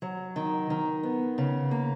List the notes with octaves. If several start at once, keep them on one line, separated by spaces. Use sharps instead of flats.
F#3
D#3
D#3
B3
C#3
A#3